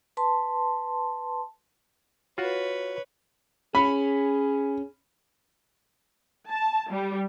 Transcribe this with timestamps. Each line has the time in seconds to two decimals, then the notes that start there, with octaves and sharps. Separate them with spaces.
0.17 B4 A5 C6
2.38 F4 F#4 B4 C#5 F#5
3.75 C#4 G#4 B5
6.48 A5
6.90 G3